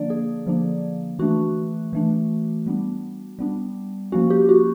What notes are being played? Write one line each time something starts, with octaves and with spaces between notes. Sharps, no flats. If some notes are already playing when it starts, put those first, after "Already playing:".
Already playing: D3 F3 A#3 D4 D5
G#4
D3 F3 A#3 D4
E3 A3 D4 F#4
E3 A3 D4
G3 B3 D4
G3 B3 D4
F3 A#3 C#4 F#4
G4
F#4